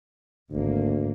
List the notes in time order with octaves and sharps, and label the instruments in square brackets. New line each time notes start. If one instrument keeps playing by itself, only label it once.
[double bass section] G#1 A#3 [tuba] D2